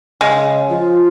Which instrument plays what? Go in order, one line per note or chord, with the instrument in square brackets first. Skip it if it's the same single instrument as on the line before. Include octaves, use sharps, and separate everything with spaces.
[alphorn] C#3 [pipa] G#3
[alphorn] F3 [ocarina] F4